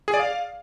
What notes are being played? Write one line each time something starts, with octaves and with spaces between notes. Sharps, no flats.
G#4
D5
F5